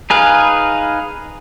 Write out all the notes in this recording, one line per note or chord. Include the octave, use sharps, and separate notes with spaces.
D#4 G#4 B4 F5